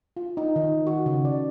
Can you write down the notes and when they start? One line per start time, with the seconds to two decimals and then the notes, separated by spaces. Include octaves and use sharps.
0.16 F4
0.37 D#4
0.56 D#3
0.87 F#4
1.06 C#3
1.25 D5